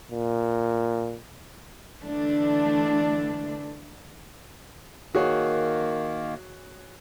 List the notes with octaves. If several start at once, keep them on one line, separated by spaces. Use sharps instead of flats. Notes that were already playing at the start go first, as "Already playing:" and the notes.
A#2
D3 E3 A3 D4
D#3 A#3 F#4 G#4 C#5